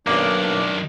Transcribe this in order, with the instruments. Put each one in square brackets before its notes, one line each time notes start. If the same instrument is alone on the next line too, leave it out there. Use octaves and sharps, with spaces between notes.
[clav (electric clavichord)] B1 A#3 [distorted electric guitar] F#2 D#3 [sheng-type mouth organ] D4 [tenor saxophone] D5